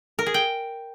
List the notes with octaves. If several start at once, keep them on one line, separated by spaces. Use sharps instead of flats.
A#4
G#4
G5